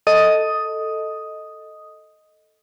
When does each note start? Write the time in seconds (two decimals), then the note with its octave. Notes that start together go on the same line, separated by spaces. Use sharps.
0.07 A4 D#5 D#6